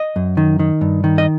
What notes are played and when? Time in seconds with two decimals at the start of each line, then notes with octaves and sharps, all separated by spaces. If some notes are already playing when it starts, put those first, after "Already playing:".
Already playing: D#5
0.16 F#2
0.37 D#3
0.59 D#3
0.81 G2
1.04 D#3
1.18 D#5